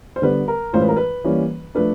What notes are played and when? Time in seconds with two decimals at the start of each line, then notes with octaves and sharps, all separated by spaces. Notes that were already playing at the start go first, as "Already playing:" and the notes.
0.16 C5
0.22 D3 G3 B3 B4
0.48 A#4
0.73 A2 E3 G#3 C#4 F4 C5
0.81 B4
0.88 A#4
0.96 B4
1.24 E3 G3 A#3 C#4
1.75 F3 A3 D4 B4